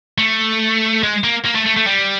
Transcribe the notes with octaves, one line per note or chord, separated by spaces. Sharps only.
A3
G#3
A#3
A#3
A3
A3
A3
G3